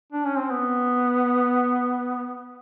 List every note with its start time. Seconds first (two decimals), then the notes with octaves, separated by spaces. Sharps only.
0.12 D4
0.25 C#4
0.38 C4
0.50 B3